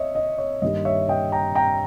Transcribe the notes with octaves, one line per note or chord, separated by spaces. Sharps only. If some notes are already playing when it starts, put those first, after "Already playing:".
Already playing: C#5 D#5 E5
D#5
C#5
G2 D#3 G3 A#3 D#5
C#5 E5
D#5 G5
G5 A#5
G5 A#5